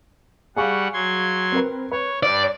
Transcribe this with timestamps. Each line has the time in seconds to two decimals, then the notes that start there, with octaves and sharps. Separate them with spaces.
0.56 G3 G#4 F5 F#5 C#6
0.94 F#3 C6 G#6
1.52 C4 A#4 B4
1.92 B4 C#5
2.23 G2 D5